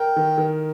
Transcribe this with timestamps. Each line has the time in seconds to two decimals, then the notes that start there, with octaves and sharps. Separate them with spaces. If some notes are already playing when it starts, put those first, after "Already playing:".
Already playing: A#4 G5
0.16 D#3
0.38 D#3